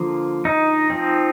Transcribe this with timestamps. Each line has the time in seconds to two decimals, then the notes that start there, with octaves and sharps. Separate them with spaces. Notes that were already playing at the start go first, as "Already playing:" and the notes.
Already playing: D3 F3 A#3
0.45 D#4
0.90 F3 C4